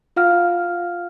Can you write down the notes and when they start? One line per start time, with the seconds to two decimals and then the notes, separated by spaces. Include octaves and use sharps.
0.16 F4 F5 F#5 F6